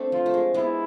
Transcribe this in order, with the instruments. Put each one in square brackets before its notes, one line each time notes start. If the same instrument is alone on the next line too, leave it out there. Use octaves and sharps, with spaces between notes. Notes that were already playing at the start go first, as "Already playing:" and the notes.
Already playing: [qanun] A3 C4 D4
[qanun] F3 [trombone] F4
[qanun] A3
G#3
[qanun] G#3 B3 [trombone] E4